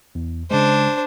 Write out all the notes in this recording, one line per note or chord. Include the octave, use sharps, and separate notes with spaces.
E2
C#3 G#3 D4 C5